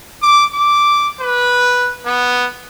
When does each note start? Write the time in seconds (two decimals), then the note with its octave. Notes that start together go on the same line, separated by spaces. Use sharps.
0.22 D6
0.54 D6
1.21 B4
2.06 B3